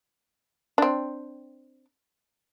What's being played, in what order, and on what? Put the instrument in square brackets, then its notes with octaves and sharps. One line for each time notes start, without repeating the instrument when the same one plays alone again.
[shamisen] C4 D4